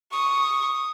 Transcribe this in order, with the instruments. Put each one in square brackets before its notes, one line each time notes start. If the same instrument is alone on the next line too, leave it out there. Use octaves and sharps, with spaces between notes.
[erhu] C#6 [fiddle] D#6